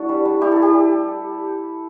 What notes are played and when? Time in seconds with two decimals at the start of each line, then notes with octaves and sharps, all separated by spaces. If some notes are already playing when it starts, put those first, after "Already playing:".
Already playing: A3 D4 E4 F#4 A4
0.09 G3
0.25 G3
0.41 E4 G4
0.52 E4 A4
0.62 G4
0.73 G3